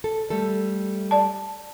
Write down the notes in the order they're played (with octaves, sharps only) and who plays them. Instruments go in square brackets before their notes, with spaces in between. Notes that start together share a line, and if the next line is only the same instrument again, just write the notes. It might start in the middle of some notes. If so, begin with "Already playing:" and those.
[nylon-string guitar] A4
G3 A3 A4
[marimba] D5 A5